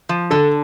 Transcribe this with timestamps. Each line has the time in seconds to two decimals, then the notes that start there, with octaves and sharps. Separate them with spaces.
0.09 F3
0.31 D3 A4